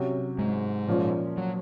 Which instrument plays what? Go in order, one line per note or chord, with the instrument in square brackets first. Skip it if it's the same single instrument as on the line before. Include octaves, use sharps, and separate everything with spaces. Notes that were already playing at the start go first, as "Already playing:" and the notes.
Already playing: [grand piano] C3 F#3 C#4 F#4
[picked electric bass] G#2 G#3
[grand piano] A#2 F3 A#3 C#4 F4
[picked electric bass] F#3